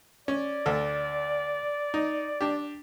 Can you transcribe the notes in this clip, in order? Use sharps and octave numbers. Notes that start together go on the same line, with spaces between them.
C#4 D5
D2 A4
D#4
D4 G4